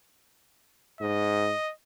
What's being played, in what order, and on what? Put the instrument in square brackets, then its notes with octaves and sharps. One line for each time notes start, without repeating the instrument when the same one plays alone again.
[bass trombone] G#2 [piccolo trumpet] D#5